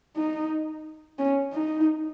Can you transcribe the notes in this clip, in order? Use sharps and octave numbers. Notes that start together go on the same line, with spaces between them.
D#4
C#4
D#4